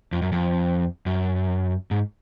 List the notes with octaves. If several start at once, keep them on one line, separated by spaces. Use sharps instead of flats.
F2
F#2
F2
F#2
G#2